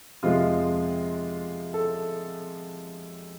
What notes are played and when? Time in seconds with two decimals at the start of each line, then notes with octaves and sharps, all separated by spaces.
0.23 F2 C3 F3 G#3 F4
1.74 A4